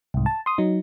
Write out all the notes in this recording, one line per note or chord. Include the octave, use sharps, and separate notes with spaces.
C2 G#2
A5
C6 D#6
F#3 D#4